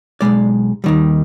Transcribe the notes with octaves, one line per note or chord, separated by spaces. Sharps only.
B1 B2 G#3 D5
D#2 D#3 G3